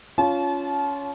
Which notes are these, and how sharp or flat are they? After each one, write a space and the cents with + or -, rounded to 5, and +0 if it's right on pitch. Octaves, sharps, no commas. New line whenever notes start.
C#4 +15 F4 +0 A5 -35